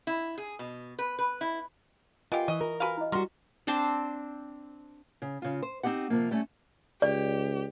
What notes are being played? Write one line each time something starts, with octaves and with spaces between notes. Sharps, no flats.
E4
G#4
B2
B4
B4
E4
B3 F4 G4 A#4 D#5 G#5
E3 D#5 C#6
F4 A#4
F#4 B4 F5 G#5 A#5
E4 D#5
G3 F#4 A#4 C6
C4 D4 C5 A5
C#3
C#3 F4
C5
C4 D4 D#4 G4 F#5
C3 F3 A#3
G3 A3 C#4
C#2 G4 D5